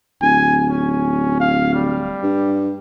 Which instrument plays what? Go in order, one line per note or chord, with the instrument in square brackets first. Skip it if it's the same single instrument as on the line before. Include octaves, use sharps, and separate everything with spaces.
[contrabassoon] D1 [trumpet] G#5
[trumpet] C#4
F5
G3
[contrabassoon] G2